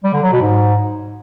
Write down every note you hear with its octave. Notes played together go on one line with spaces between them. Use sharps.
G3
D3
F#3
B2
G#2